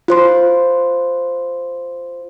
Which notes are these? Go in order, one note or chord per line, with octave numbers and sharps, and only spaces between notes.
F4 C5 C6